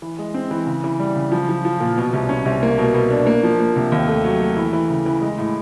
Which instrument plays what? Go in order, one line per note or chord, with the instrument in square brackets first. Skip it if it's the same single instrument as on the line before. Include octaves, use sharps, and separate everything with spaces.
[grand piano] E3
G#3
C4
E3
C#3
E3
G3
C#3
F3
F3
F3
A#2
B2
C2
C#4
C2
A#3
B2
B2
D4
A#3
F3
A#3
C3
D#2
A3
F#3
A3
E3
E3
C#3
E3
G#3
A2